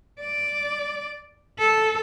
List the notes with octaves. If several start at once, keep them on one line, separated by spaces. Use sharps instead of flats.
D5
A4